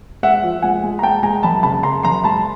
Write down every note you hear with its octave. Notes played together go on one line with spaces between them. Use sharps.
G#3 E5 F#5
F3
G#3 F#5 G#5
G#3
A#5
G#3 G5 A5
G#3 G#5 A#5
F#2 A5 B5
C#3 A5 B5
C#3 A#5 C6
F#2 A#5 C6
G#3 A5 B5